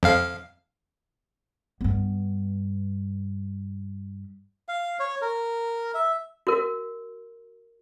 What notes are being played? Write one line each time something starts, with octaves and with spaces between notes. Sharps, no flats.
F2 F5
G2 B3
F5
C#5
A#4
E5
F#4 A#4